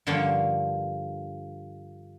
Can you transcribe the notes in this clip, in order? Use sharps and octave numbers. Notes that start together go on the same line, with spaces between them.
G2 D3 F3 A#3 C#5 G5